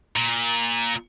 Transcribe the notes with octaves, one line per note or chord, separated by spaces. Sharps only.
A#2